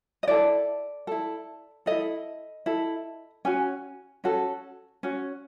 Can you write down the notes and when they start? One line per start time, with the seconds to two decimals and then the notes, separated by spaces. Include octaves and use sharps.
0.23 D#5
0.28 E4 A4 D5
1.07 E4 A4
1.86 E4 A4 D#5
2.66 E4 A4
3.45 C#4 F#4 G#5
4.24 C#4 F#4 A4
5.03 C#4 F#4